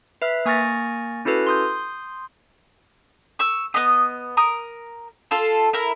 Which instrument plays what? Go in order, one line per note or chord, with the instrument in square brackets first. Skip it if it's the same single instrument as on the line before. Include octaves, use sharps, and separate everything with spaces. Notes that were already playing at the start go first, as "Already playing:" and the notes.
[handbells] B4 E5 F6
A#3 G#5 C#6 F6 A6 A#6
C#4 E4 F#4 A4 B4
C6 D#6 G6
[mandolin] C#6 E6
B3 D#5 D#6
A#4 D#6
F4 A4 A5
E4 A#4